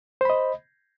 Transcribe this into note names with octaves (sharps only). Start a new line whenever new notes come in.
C5 D#5 B5